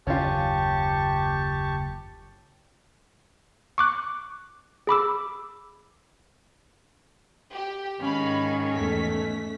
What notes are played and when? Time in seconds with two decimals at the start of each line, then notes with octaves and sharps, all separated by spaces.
0.07 F#1 D#2 C#4 F4 G4 A5 C#6
3.78 C#6 D6 F#6
4.87 G#4 B5 D6 E6
7.52 G4
8.01 G#2 D#3 C#4 F5 B5
8.73 E2 A3 B6